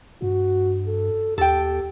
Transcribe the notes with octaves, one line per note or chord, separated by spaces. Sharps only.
G2 F#4
A4
D#2 G4 A4 G5